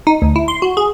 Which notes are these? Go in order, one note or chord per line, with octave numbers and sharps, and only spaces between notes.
D#4
D2
E4
C6
F#4
G#4